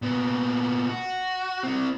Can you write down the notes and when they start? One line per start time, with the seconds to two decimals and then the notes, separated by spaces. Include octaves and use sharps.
0.02 A#2 B3
0.89 F#4
1.63 C4 E4